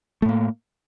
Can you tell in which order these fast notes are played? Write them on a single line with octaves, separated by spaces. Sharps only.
A3 A2 A#3